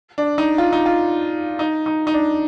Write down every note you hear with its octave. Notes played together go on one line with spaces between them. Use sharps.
D4
D#4
F4
D#4
F4
D#4
D#4
D#4
D4